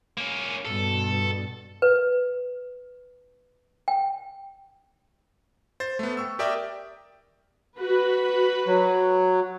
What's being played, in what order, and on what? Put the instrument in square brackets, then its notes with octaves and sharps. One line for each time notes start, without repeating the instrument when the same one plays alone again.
[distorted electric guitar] A#3 C#4
[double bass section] G2 B2 [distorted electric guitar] A4
[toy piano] B4
G5
[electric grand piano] C5 A6
A3 B3
G5 C#6 E6
G4 A#4 D5 E5 G5 D#6
[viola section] F#4 B4
[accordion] F#3